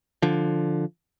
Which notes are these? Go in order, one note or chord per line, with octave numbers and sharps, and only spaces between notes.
D3 F3